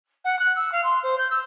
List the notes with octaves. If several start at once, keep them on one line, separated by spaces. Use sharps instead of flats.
F#5
F#6
E6
F5
C6
C5
G6
E6